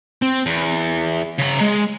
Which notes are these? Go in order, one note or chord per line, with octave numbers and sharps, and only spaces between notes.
C4
E2
C#3 A#5
G#3